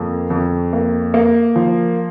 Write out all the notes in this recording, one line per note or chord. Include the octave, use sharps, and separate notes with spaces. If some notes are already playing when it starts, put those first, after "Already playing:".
Already playing: F2 A#3
F2
A#3
A#3
F3